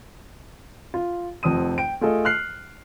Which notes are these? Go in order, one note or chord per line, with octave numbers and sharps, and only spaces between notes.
F4
F1 F2 C4 D#6 D#7
G5 D7
A3 F4 G#4 A4 D#5
F6 F#6 C7